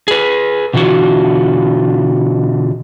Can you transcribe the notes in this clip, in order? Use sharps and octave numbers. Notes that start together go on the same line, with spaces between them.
G#4 B4
B2 D3 E3 F4 F#4